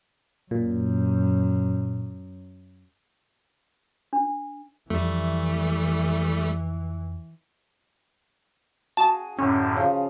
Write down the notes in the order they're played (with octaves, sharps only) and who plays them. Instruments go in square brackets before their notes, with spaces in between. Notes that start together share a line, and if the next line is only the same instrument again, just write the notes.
[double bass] F#2 [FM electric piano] A#2
[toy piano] D4
[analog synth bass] F2 [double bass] E3 [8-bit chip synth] G3 A3
[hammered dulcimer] F#4 G#4 [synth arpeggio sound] A5
[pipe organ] F#2 A2 D3 [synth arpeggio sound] C#4
[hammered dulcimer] C#3 F3